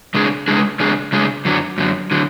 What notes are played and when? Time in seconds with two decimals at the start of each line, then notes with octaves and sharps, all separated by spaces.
0.14 C#3 G#3 D4 G#4
0.48 C#3 G#3 D4 G#4
0.80 C#3 G#3 D4 G#4
1.12 C#3 G#3 D4 G#4
1.45 F#2 D3 F#3
1.78 F#2 D3 F#3
2.11 D3 F#3